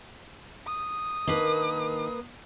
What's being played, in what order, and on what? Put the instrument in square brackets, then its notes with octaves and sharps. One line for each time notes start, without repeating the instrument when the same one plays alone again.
[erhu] D#6
[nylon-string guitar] D#3 D4 [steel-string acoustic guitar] A#3 B4